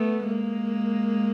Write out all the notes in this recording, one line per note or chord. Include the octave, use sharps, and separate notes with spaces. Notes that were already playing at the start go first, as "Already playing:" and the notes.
Already playing: A3 B3
G#3 A#3